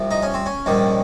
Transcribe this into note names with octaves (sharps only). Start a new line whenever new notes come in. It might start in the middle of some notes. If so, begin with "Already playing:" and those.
Already playing: C2 C3 F3
D#4
C#4
C4
C#4
A#1 G#2 D#3 G3